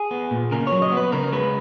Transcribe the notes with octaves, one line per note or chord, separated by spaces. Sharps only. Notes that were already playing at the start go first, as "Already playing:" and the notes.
Already playing: G#4
B3
A#2
C#3 A#4
C#5
F#3
D#5
B3
B4
C#3 A#4
G#3 B4